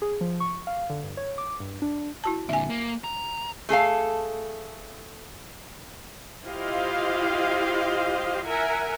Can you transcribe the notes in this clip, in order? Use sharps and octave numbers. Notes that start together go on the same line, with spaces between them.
G#4
F3
C#6
F5
D3
G2
C#5
D6
G2
D4
E4 F#4 A5
A#2 D3 E5 G#5
A#3
A#5
A3 G#4 A4 F5
E4 F4 G4 C5 D#5 F5
A#4 E5 F#5 G#5